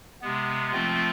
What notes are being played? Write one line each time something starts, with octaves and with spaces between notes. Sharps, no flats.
C3 G#3 B3
F3 A3 C4 F4